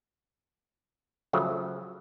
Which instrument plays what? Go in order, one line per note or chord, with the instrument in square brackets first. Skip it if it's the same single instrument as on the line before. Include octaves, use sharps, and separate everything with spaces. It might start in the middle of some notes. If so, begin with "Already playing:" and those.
[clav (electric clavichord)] C#3 F3 F#3 A3